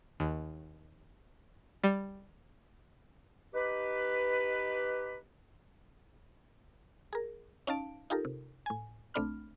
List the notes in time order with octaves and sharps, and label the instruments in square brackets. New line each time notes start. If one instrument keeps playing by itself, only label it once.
[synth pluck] D#2
G3
[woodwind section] D#4 G4 B4
[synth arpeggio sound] G#4 A#4
C#4 D#4 F5 A5 D7
D#4 F4 G4 A4 A#4
C3
A2 G#5
B1 A3 C4 D4 B5 F6